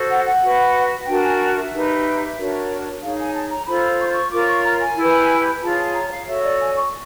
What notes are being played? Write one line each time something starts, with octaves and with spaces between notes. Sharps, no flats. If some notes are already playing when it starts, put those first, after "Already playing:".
Already playing: F#4 A4 C5
F#5
F#5
F#4 B4
D4 F#4 A#4 G5
G#5
E5
D#4 G4 B4
D4 F#4 A#4 C#5
D#4 G#4 C#5 F5
G#5
A5
A#5
F4 A4 C5 B5
C#6
C6
C#6
F4 A#4 C#5 D6
C#6
A#5
G#5
E4 G4 B4
F4 G#4 C#5 A5
A5
A#5
F5
F#4 A4 C#5 E5
D5
G#5
C#6